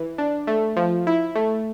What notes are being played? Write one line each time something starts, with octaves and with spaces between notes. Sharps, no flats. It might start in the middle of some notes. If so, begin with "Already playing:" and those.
Already playing: E3
D4
A3
F3
E4
A3